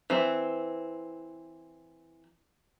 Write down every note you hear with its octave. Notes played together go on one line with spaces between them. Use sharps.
E3 C4